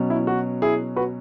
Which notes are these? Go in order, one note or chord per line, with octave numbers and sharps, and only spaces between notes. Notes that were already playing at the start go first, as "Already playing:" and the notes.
Already playing: B2 F#3 C#4
E4
F#4
E4 G#4
F#4 B4